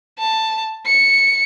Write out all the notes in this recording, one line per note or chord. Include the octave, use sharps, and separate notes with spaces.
A5
C#7